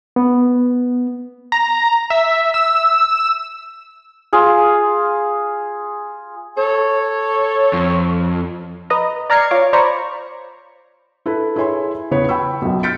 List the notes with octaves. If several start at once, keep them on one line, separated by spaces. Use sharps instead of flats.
B3
A#5
E5
E6
F4 G#4 F5
A4 C#5
F2
B4 D#5 A#5
D5 A#5 F6 G#6 C7 C#7
F4 C#5 D6
C5 D5 A#5 B5 C#6
E4 A4 B4
E4 G#4 C#5 E5 G#5 C6
E2 C#3 B3 B4 C#5
G5 A5 B5 C#6 E6
B1 F#2
F6 G6 A6 B6 C#7 D7